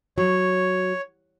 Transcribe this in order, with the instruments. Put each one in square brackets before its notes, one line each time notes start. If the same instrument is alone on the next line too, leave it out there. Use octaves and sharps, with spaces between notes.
[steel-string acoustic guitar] F#3 [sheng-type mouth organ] C#5